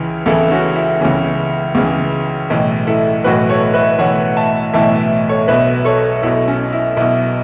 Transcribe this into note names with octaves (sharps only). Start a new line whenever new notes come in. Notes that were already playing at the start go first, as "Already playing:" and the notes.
Already playing: C#2 C#3 E3
C#2 C#3 E3 E4 A4
C#4 F#4
E4
C#2 C#3 E3 C#4
C#2 C#3 E3
B1 A2 E3
E4 A4
B1 A2 E3 F#4 B4
A4 C#5
B4 E5
B1 A2 E3 C#5 F#5
E5 A5
B1 A2 E3 E5 A5
A4 C#5
B1 B2 B4 E5
A4 C#5
B1 B2 E4 A4
C#4
E4
B1 B2 E4